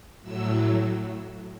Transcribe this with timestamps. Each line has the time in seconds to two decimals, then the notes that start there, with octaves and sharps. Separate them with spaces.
0.23 A2 F#3 E6